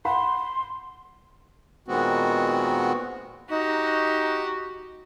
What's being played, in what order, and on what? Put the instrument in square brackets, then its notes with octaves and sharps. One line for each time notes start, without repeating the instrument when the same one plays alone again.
[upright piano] F#5 B5 [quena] C6
[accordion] A#2 D#3 G#3 B3 C4 F#4
[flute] D#4 [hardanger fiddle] F#4 G4